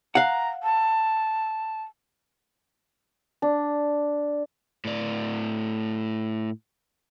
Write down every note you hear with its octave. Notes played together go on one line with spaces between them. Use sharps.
F5 F#5 A#5
A5
D4
A2 D5